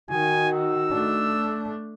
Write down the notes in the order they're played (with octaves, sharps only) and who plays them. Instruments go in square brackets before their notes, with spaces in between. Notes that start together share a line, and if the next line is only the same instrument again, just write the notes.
[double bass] D#3 [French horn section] D#4 F#4 [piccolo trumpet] G#5
[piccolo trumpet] E6
[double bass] A3 D4